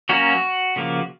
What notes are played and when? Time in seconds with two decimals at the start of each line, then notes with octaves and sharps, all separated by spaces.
0.09 F#3 A#3 C#4 F#4
0.76 C#3 F3 A#3